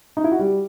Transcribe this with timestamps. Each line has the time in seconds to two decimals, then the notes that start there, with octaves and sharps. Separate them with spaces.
0.17 D#4
0.24 E4
0.32 F#4
0.39 G3